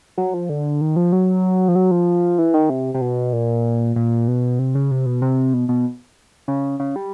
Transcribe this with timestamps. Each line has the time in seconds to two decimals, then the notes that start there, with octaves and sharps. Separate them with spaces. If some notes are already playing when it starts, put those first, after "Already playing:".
0.18 F#3
0.34 F3
0.49 D3
0.81 D#3
0.96 F3
1.12 F#3
1.68 F3
1.75 F#3
1.91 F3
2.38 E3
2.54 D#3
2.70 C3
2.94 C3
3.01 B2
3.33 A#2
3.96 A#2
4.28 B2
4.59 C3
4.75 C#3
4.91 C3
5.06 B2
5.22 C3
5.54 B2
5.69 B2
6.48 C#3
6.80 C#3
6.96 G3